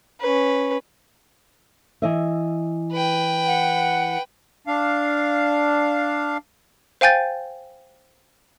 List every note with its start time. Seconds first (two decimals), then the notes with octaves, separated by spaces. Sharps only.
0.21 C#4 B4
2.02 E3 D#5 E5
2.92 B4 G5
3.47 F#5
4.67 D4 F5
7.01 C5 F5 G5 G#5 G6 A6